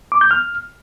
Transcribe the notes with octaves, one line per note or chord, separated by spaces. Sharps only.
D6
G6
F6